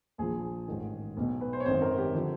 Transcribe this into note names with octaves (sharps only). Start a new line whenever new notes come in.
A#1 A#2 F3 G#4
A1 G#2 D#3
B1 B2
B4
C5
C#5
G#1 F#2 D#3 C5
A#4
G4
D3 F3